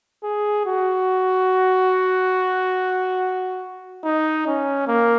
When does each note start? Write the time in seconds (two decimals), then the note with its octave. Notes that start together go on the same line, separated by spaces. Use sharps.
0.23 G#4
0.66 F#4
4.04 D#4
4.47 C#4
4.88 A#3